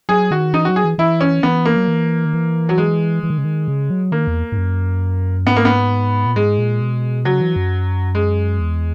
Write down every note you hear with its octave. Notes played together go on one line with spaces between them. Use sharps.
F#3 G#4
D#3 F#4
E3 D#4
F#3 F#4
G#4
E3
E3 E4
C#4
E3 B3
A#3
F#3
E3
D#3
E3
F#3
G#3
E3
D#3
C#3
D#3
C#3
F#3
D#3 A#3
E2
G#2
F#2
G#2 B3
A#3
B3
A#2
G#2 G#3
A#2
B2
C#3 F#3
E3
F#2
G#3
E2